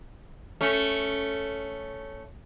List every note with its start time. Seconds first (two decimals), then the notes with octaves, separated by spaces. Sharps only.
0.61 A3 C#4